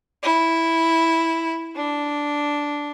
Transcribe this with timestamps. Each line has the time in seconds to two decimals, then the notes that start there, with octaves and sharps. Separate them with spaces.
0.23 E4
1.75 D4